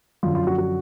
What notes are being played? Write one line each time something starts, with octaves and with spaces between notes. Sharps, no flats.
F#2 D3 F3 F4
F4
F#4
F#4